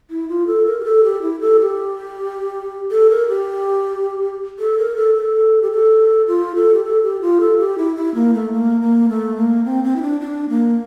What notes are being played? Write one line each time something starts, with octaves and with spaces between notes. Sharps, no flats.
E4
F4
A4
A#4
G4
A4
G4
E4
A4
G4
A4
A#4
G4
A4
A#4
A4
A4
G4
A4
F4
A4
G4
A4
G4
F4
A4
G4
E4
E4
A#3
A3
A#3
A#3
A3
A#3
C4
C4
E4
D4
D4
A#3